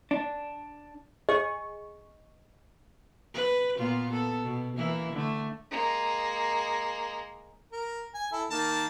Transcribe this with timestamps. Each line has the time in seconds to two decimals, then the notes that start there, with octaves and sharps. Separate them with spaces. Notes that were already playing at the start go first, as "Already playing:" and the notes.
0.11 D4
1.29 G#4 D#5 C#6
3.34 B4
3.78 A#2 B3 F4
4.11 B3 A4
4.45 B2
4.77 E3 A#3 E4
5.13 D3 A3
5.71 G#3 A#3
7.72 A#4
8.15 G#5
8.32 E4 A4 E5
8.50 D#3 A#3 A5